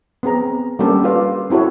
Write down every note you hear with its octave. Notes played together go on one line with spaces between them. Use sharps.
B3 C4 G#4 A#5
G3 A#3 C#4 D4 G4 A4
F4 A4 B4 D5 F5
C4 E4 F#4 A4 C#5